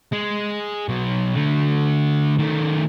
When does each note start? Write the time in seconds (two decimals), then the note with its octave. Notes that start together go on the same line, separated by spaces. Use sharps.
0.12 G#3
0.89 B2 F#3
1.36 D3 A3
2.39 D#3 A3